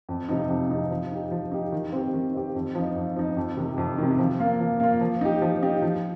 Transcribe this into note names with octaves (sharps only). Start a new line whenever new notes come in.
F2
C3 F3 D#4
F2
C3 F3 D#4
F3
D#4 G4
F3
D#4 G4
D#3
C4 G4
D#3
C4 G4
F2
F3 D#4
F2
F3 D#4
F2
C3 D#3
F2
C3 D#3
F3
A#3 F4
F3
A#3 F4
F3
D#4 G4
F3
D#4 G4
F3